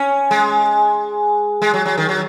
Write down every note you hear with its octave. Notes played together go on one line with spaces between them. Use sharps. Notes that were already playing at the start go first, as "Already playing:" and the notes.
Already playing: C#4
G#3
G#3
F#3
F#3
D#3
F#3